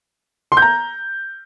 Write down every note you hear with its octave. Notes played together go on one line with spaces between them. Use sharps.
C6
G6
A#5